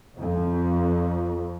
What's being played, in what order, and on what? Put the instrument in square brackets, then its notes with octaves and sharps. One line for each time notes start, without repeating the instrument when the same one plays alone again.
[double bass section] F2